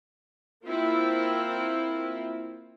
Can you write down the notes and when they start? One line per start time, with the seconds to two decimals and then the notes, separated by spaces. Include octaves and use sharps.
0.66 A#3 C4 E4 F4